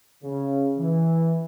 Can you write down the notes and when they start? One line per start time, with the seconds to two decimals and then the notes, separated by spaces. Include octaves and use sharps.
0.23 C#3
0.78 E3